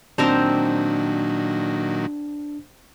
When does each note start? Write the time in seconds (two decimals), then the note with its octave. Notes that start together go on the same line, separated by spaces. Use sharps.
0.18 A#2 D#3 F#3 C4 D4 A#4 C5